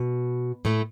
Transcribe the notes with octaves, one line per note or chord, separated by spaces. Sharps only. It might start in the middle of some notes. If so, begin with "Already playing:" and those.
Already playing: B2
A2 A3